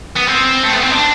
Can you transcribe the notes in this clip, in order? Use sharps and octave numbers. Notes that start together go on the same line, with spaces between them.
B3
C4
A3
B3
C4
D4